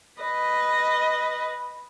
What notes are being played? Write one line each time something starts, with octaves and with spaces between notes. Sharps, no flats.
B4 D#5